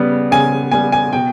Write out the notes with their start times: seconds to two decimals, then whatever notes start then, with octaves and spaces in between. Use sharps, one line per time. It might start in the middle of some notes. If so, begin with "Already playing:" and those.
Already playing: C#3 G3 B3
0.31 C#3 G#5
0.72 G3 B3 G#5
0.92 G#5
1.13 B2 G5